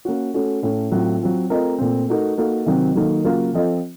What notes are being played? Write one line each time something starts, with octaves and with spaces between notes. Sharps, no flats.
A#3 C#4 F#4
A3 C#4 F#4
A2 A3 C#4
A2 F#3 C4 F4
F#3 C4 F4
A3 C4 F4 A#4 D#5
A#2 A3 C4
A3 D#4 F#4 A#4
A#3 D#4 F#4 A4
C3 D#3 F#3 C4
D#3 F#3 A#3 D#4 A4
C#3 F#3 A#3 F4 A#4
F3 C4 F4 A4 D#5